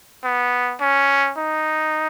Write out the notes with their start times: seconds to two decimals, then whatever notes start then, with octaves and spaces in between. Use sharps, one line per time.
0.24 B3
0.81 C#4
1.38 D#4